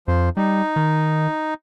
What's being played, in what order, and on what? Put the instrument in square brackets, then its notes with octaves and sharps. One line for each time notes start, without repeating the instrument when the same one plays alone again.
[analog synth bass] F2 [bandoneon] F3 C5
[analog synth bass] G3 [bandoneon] D#4
[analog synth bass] D#3